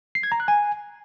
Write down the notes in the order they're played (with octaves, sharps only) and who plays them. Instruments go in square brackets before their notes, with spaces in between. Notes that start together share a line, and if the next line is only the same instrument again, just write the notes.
[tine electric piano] C7
G#6
A#5
F#6
G#5